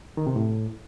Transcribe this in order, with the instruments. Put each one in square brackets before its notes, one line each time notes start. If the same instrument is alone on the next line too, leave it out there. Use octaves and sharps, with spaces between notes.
[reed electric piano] D#3
C3
A2